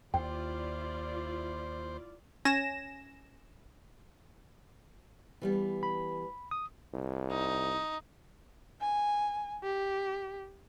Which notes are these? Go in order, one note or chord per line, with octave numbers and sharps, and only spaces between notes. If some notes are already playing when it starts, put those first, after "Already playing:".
D#2 E4 F4 C5 D5 G5
C#4 G#5 A#6 E7
E3 G3 B3
B5
D#6
C2
D#4
G#5
G4